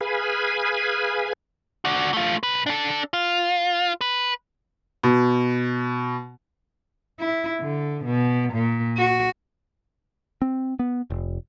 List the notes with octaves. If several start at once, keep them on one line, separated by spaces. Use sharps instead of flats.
G#4 B4 F5 G#5 B5
D4 F#4
A3 F4
B1 B4
D4 A4
F4
B4
B2
E4
D3
B2
A#2
F#4
C4
B3
F1